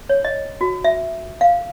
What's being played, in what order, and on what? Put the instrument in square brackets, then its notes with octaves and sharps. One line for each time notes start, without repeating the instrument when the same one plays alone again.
[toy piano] C#5
D#5
F#4
E5
F5